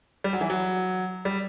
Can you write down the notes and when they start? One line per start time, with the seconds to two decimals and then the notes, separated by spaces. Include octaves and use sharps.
0.24 G3
0.33 F#3
0.41 E3
0.50 F#3
1.25 G3